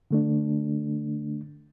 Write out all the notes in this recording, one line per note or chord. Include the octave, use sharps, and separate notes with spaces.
D3 A3 D4